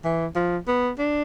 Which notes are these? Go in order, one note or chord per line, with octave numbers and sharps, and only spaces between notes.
E3
F3
B3
D4